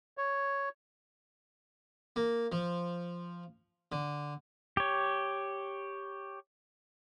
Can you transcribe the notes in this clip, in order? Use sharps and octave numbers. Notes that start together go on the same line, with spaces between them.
C#5
A#3
F3
D3
G4 C#5